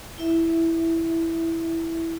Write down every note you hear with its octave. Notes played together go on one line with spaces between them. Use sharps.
E4 E5